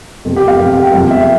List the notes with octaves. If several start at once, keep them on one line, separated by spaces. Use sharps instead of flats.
F1 F2 C3
G4
F5
F1 F2 C3
G5
E1 E2 C3 F3 F5
E5